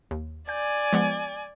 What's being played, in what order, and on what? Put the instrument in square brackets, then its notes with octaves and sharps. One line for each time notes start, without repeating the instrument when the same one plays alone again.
[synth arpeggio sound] D#2
[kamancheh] D5 G#5 [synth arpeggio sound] G6
[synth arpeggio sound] F3 G#3 B3